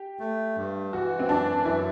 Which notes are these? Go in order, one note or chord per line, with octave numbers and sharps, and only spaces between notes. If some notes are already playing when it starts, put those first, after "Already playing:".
Already playing: G4
A3
G2
E3 F#4
C4
F#2 D4
F#2 E4